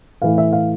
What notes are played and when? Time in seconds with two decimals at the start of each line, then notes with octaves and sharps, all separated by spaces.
0.22 A2 E3 A3 F5
0.38 E5
0.53 F5